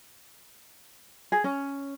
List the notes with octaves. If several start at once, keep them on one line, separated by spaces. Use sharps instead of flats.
G#4
C#4